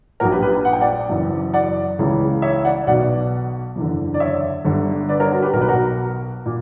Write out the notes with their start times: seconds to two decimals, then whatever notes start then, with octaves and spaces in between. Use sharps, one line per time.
0.20 A#1 A#2 F#4 A#4
0.31 G4 B4
0.42 G4 B4
0.65 F#5
0.73 G5
0.81 D5 F#5
1.09 F#1 F#2 E3
1.53 D5 F#5
1.99 C#2 C#3 E3
2.42 C#5 E5
2.65 D5 F#5
2.87 B1 B2 D5 F#5
3.76 F#1 E2 D3
4.14 D5
4.20 C#5 E5
4.65 G1 G2 D3
5.09 B4 D5
5.20 A#4 C#5
5.31 F#4 A#4
5.42 G4 B4
5.53 B1 A#4
5.56 B2 B4
5.69 F#4 A#4
6.46 A#2